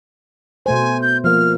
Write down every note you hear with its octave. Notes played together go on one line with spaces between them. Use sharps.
B2 A3 C5 G#5
G6
F3 A#3 F6